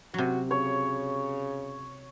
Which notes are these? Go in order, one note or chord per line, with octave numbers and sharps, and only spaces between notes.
C3 F#3 F#4
C#3 C#5